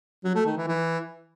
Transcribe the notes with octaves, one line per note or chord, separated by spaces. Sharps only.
F#3
A3
D#3
E3
E3